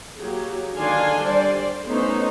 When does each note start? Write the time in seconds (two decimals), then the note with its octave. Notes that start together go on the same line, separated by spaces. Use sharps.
0.19 F#3 A#3 G4 G#4
0.77 D3 D#3 D4 F5 G#5 C6
1.22 G3 C5 D5
1.86 A3 B3 C#4 D#4 C5